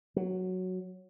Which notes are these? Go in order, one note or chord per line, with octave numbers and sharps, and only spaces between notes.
F#3